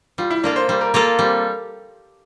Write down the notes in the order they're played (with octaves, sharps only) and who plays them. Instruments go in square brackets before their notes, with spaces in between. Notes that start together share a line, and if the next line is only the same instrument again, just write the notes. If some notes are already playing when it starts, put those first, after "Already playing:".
[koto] G3 [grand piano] F4
[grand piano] E4
[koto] A#3 F4 A4 [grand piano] D4
[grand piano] C5
[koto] G3 [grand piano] C5
[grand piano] A#4
[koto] A#3 F4 A4 [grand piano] A#4
[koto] G3 [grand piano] C4